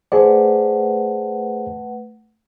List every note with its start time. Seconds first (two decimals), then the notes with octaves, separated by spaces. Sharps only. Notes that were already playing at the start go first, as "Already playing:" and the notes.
0.12 A3 G#4 B4 C5 D5 F#5